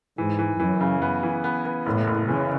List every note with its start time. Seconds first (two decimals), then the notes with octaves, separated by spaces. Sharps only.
0.18 G#2 E3
0.39 E3
0.60 F#2 E3
0.81 C#3
1.02 B3
1.23 E3
1.44 B3
1.65 B3
1.86 F#1 A2
2.07 F#1
2.28 C#3 E3